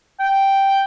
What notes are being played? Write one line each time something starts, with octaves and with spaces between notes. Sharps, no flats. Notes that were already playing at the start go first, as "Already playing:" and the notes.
G5